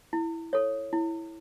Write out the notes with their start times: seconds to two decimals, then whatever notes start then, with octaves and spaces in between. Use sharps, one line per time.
0.13 E4
0.53 A4 C#5
0.93 E4